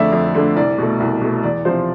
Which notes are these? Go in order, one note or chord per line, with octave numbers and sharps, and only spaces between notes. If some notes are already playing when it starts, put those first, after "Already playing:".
Already playing: F2 D3 A3 D5 E5
F2
D3 A3
C2 D5
B2 A3
C2
B2 A3
E2 D5
C3 F3 C5